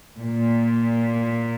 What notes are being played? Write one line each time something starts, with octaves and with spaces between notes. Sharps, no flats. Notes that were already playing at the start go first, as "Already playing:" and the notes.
A#2